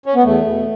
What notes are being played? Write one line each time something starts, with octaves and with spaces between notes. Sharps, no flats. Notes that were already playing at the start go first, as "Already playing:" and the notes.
C#4
B3
E2 A3
B2